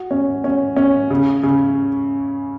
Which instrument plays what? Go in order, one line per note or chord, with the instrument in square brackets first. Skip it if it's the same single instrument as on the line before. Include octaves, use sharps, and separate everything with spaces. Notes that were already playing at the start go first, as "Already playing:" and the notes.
Already playing: [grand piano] F#4
C#4
C#4
C#4
C#3
C#3